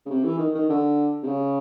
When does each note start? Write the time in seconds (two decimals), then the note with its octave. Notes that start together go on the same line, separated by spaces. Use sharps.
0.06 C#3
0.10 C3
0.24 E3
0.39 D#3
0.55 D#3
0.70 D3
1.23 C3
1.27 C#3